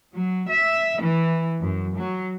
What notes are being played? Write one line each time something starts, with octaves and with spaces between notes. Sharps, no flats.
F#3
E5
E3
F#2
F#3